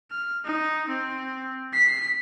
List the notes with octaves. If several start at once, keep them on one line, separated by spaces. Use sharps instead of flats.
F6
D#4
C4
B6 C7